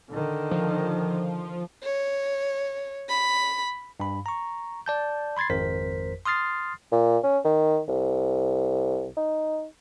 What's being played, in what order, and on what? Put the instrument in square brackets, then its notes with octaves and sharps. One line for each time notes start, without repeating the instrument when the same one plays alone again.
[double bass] D3 D#3
[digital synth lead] F3
[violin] C#5
B5
[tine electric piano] G2 B5
A#5 C#6
D5 A5 G6
B5 C6 G#6 A6 C7
G#1 F2 A#4 C5 B6
C6 D#6 F6 A6 C7
[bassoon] A#2
C#4
D#3
C2
D#4